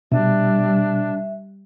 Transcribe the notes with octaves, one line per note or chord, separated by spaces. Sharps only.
B2 G3 D4 E5